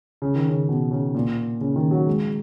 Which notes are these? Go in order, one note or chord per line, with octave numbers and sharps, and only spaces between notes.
C#3
D#3
C#3
B2
C#3
A#2
C#3
D#3
F#3
G#3